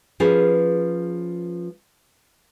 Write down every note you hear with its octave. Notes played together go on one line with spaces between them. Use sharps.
F3 C#4 G#4 B4